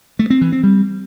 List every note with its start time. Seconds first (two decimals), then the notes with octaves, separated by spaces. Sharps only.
0.19 A3
0.30 C4
0.41 E3
0.52 C4
0.63 G3